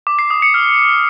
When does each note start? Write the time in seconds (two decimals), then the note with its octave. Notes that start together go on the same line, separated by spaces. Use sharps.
0.07 D6
0.19 C7
0.30 D#6
0.42 C#7
0.54 F6